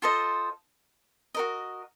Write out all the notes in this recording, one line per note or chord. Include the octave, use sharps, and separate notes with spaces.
F4 A4 C5 D#5
F#4 A#4 D#5